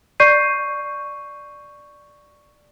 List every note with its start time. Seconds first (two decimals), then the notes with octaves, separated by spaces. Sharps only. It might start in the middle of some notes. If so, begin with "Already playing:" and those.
0.20 D5 C#6 G6 C7 D#7